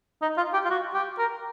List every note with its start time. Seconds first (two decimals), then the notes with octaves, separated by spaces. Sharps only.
0.22 D#4
0.38 F4
0.54 G4
0.65 F4
0.70 F#4
0.94 G4
1.19 A#4